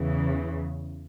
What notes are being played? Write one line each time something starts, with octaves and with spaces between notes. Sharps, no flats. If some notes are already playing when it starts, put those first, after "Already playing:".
Already playing: E2 C#3 E3